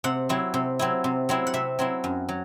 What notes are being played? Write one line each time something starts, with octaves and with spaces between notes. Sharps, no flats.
C3 F#5
F#3 C4 E4
C3
F#3 C4 E4
C3
F#3 C4 E4
F#5
C3 E5
F#3 C4 E4
F#2
F#3